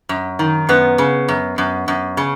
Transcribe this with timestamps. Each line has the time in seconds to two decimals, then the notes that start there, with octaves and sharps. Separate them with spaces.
0.09 F#2
0.39 D#3
0.69 F#2 B3
0.98 C#3
1.28 F#2
1.58 F#2
1.88 F#2
2.17 C#3